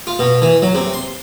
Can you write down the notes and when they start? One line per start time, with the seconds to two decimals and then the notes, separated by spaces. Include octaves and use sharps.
0.07 F4
0.19 B2
0.42 E3
0.62 F#3
0.75 C3
0.93 C6